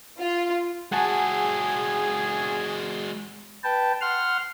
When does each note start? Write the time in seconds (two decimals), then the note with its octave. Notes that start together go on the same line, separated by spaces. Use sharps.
0.18 F4
0.92 G#3 F#4 G#4 F#5 G#5 A5
3.64 B4 G5 A5
4.01 F#5 C6 F6